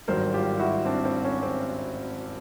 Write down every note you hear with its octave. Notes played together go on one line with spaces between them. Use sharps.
G#1 G2 D#3 F#3 A#4 C5
F4 G4
E4 F#4
C4 D4
C4
C#4
C4